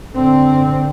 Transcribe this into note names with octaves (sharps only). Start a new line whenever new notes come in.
D3 C4